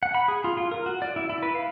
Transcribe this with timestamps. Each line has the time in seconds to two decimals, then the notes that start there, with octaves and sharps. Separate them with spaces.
0.03 F#5
0.15 B5
0.28 G#4
0.44 F4
0.57 F4
0.71 A#4
0.86 F#4
1.02 D5
1.16 E4
1.30 E4
1.43 B4
1.55 F5